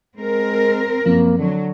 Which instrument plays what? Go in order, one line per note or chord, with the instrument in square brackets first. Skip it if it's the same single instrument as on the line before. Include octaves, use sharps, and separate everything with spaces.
[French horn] G#3 [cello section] C4 A#4
[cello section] F#2 [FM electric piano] F3 C4 [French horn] A#3
[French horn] D3 [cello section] F#3